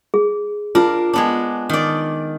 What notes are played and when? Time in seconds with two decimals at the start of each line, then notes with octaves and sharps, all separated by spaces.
0.14 G#4
0.75 D4 F4 A#4 F5
1.13 G#3 B3 D4
1.69 D#3 D5